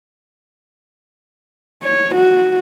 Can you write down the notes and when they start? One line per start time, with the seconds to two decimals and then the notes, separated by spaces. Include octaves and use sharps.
1.82 C#5
2.15 F#4